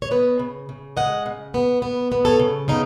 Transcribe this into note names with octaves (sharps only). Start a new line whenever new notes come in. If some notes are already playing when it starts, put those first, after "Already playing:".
C#5
B3 B4 D#5
C#3
C#3
G#3 D#5 F#5
C#3
B3
B3
B3
A4 C#5
C#3
C#3 B3 D#4